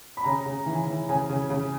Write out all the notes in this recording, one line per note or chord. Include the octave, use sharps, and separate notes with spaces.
B5
C#3 A#5
C#3
E3
E3
C#3 G#5
C#3
C#3